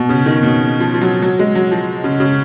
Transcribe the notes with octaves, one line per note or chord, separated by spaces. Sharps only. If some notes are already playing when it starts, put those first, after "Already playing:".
Already playing: B2
C#3
D#3
B2
F3
F3
F#3
F#3
G#3
F#3
F3
C#3
C#3